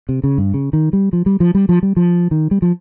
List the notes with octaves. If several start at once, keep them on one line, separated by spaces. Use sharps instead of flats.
C3
C#3
G2
C#3
D#3
G3
F3
G3
F3
G3
F3
G3
F3
D#3
G3
F3